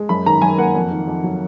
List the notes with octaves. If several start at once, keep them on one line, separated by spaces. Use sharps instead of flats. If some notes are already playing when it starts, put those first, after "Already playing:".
Already playing: G#3
F#2 B5
D#3 A#5
F#2 G#5
A#3 F#5
F2
D#3
F2
F#3